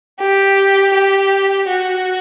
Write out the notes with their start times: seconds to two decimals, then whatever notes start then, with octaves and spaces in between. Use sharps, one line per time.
0.20 G4
0.94 G4
1.68 F#4